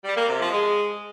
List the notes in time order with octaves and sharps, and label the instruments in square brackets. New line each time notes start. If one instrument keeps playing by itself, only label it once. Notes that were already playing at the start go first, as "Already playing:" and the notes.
[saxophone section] G3
A#3
C3
F3
G#3